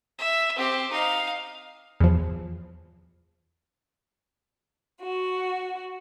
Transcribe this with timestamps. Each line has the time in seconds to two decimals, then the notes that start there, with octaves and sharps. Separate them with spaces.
0.18 E5
0.56 C4 G4
0.91 D#4 F5
2.00 E2 F3
5.01 F#4